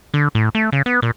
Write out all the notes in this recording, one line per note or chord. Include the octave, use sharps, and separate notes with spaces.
D3
A2
A3
C#3
B3
A#2